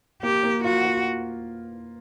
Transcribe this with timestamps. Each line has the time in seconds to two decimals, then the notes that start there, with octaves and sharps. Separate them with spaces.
0.22 A#3 G4
0.43 A#3
0.64 F4 F#4
0.85 F4